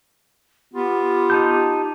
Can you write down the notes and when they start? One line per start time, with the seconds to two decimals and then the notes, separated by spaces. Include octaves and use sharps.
0.74 B3 F4 G4
1.30 D#4 A5 G6